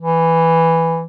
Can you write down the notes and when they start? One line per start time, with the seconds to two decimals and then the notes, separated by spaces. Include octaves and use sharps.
0.01 E3